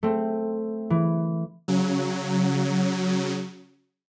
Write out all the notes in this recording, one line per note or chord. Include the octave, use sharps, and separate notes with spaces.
A3 C4
E3
C#3 F#3